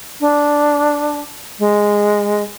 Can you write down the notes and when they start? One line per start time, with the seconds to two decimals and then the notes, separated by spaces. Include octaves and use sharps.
0.20 D4
1.59 G#3